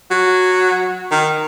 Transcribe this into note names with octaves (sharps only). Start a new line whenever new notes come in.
F#3
D#3